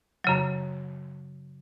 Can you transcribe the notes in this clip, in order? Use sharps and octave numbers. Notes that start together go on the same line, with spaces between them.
F#2 C#3 F#3